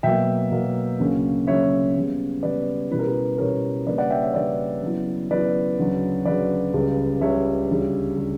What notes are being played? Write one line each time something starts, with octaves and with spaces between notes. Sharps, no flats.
B2 F#3 A#3 E5 G5
B2 F#3 A#3
D2 C#3 F#3 A#3 C#4
D2 C#3 F#3 A#3 C#4 C#5 E5
C#3 G3 B3
C#3 G3 B3 B4 D5
B2 G3 C#4 E4 B4
A#4
G4 B4
B2 G3 C#4 E4 A#4 C#5
C#3 G3 A#3 D4 B4 D5
D5 F#5
E5 G5
C#5 E5
C#3 G3 A#3 D4 B4 D5
C#3 F#3 B3 E4
C#3 F#3 B3 E4 B4 D5
D2 C#3 F#3 C#4
D2 C#3 F#3 C#4 B4 D5
C#2 C#3 G3
C#2 C#3 G3 C#5 E5
D2 C#3 G3
C#3 G3